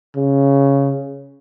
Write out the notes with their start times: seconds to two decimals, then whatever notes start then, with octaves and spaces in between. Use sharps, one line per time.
0.16 C#3